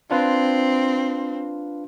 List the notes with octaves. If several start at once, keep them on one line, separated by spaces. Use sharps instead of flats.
C4 D4 F4 B4